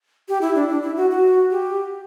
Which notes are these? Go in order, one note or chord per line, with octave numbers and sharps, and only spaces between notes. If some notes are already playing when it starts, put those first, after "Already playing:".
G4
E4
D4
D4
E4
F#4
F#4
G4